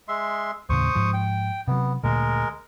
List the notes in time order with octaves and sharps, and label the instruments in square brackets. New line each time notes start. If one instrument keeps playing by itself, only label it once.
[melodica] G#3 E5 C6
[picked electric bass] D#2 A2 C#3 [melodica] C5 C#6 D#6
[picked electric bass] G#2 F3
[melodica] G5
[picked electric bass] C3 F#3 [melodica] B3
[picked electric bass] D2 A#2 [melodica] G#3 A#4